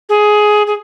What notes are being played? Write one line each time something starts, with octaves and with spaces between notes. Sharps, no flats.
G#4
G#4